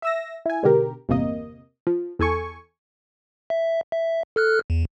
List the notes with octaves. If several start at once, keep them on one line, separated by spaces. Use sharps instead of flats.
E5 E6 A#6
E4 G#5
G#2 B2 D3 G4 A#4
G1 E2 C3 A#3 D#5
F3
E2 A4 G#5 C#6
E5
E5
A4 F6 F#6
E2